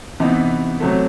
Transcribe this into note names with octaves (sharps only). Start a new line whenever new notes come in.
C3 E3 B3 D#4
C3 F#3 A3